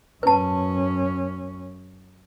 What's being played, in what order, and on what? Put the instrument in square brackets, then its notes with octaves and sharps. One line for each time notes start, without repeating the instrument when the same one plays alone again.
[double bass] F#2 C#4 [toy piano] B4 A5